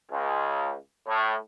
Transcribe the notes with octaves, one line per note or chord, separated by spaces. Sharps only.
C#2
A2